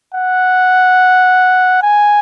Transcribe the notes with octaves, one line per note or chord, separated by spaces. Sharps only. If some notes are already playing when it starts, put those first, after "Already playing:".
F#5
G#5